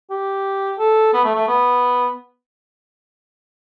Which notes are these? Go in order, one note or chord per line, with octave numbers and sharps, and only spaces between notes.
G4
A4
B3
A3
A3
B3